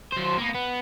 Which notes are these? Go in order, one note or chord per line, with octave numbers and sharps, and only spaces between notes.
F#3 C5
A#3 B3
B3